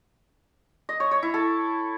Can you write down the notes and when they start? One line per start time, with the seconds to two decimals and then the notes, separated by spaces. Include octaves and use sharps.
0.89 D#5
1.00 C#5
1.11 C#5
1.23 E4
1.34 A4